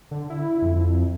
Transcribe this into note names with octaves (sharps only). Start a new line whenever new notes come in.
D3
E4
F2